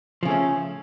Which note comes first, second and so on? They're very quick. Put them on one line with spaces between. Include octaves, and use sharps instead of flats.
F3 C#3 A3 C#4